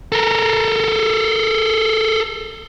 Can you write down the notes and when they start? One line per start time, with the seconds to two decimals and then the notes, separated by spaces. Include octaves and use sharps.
0.12 A4 A#4